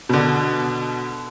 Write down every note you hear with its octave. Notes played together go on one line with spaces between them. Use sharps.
B2 D3